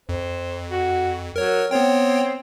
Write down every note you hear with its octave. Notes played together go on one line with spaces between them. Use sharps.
F2 C5
F#4
F#3 A#4 C#5
B3 C4 C#5 G5